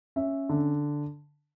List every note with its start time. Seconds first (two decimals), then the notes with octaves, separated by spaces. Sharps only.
0.16 C#4 E5
0.49 D3